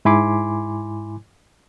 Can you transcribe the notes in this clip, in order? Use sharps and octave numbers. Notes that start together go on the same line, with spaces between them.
G#2 E4 G#5 B5 C6 D6